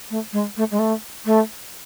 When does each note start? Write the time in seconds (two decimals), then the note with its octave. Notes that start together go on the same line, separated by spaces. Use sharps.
0.10 A3
0.33 G#3
0.57 A3
0.71 G#3
0.79 A3
1.25 A3